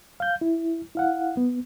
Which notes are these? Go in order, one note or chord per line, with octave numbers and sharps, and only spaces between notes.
F5 G6
E4
E4 F5 F#5
B3